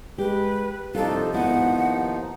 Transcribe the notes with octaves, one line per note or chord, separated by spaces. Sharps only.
G#3 G4 B4
C2 F3 D4 D#4 F4 A4
G#1 B3 E4 F#5
D#2